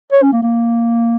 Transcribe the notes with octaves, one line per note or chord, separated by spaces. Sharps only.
C#5
C#4
A#3
A#3